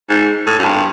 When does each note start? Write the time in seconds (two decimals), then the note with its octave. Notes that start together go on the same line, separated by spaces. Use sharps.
0.09 G#2
0.47 A2
0.59 F#2
0.64 G2